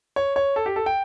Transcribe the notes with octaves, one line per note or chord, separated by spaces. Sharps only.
C#5
C#5
A4
G4
A4
G5